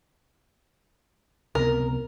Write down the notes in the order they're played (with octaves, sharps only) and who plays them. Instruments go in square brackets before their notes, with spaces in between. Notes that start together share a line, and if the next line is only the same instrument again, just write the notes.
[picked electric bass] C#2 C3 B3 [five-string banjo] A#4